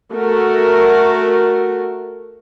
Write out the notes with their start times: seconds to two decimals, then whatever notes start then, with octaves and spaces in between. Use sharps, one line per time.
0.14 A3 F#4 A#4